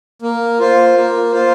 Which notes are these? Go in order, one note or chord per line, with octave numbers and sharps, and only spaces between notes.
A#3
F4 C5
A#3
F4 C5